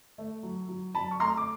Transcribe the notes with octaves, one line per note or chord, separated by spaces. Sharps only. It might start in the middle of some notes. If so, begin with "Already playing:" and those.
A3
F#3
F#3
F#3 A5 B5
C#6
A3 A#5 C6
D6